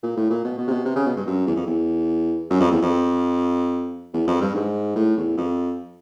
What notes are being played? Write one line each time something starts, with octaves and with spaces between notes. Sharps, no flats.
A#2
A2
A#2
B2
B2
C3
B2
C3
C#3
B2
G2
F#2
E2
F2
E2
F#2
F2
E2
F2
E2
F2
G2
G#2
A2
E2
F2